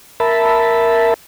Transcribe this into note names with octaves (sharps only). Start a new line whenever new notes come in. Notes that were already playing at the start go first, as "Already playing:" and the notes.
A#4 E5 A5 B5